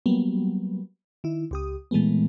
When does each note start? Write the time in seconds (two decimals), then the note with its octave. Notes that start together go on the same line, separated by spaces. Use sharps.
0.06 F#3 G3 A#3 B3
1.24 D#3 E4
1.51 C#2 G4 D#6
1.91 A#2 E3 G#3 A3 B3